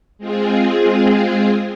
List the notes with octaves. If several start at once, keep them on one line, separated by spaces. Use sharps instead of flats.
G#3 C4 F4 G#4